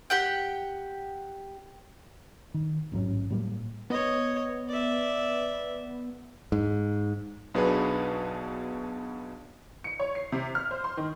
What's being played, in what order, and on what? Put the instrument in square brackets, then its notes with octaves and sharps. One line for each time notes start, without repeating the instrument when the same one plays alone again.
[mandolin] G4 F#5 G5
[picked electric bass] D#3
A1 G#2 F#3 C#4
A2 F#3 G3 A#3
[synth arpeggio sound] B3 [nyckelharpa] C#5 D#5
[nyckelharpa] D5 E5
[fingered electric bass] G#2
[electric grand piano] B1 B2 B3 D4 G#4 B4
[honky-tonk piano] C#7
C#5
C7
C3
F6
C5
C6
D#3